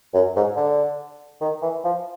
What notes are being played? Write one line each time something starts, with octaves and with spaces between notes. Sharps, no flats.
F#2
G#2
D3
D#3
E3
F3